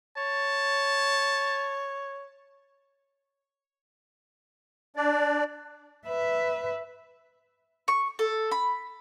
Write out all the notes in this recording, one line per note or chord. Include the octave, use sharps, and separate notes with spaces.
C#5 A5
D4 D5
B4 E5
C#6
A4
B5